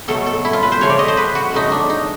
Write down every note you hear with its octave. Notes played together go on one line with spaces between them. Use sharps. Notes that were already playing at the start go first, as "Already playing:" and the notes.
B2 F#3 A3 A4
A4
E4
F4
B4
C5
C#3 F3 A3 C#5
D5
D#5
C5
B4
F#4
C#3 F3 A3 D#4
D4
D#4